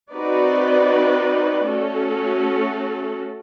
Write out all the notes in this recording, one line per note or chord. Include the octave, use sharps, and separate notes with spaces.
C4 D#4 F#4 B4 D5
A3 C#4 F#4 A4